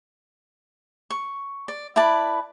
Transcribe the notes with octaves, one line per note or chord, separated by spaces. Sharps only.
C#6
D5
E4 B4 D5 A5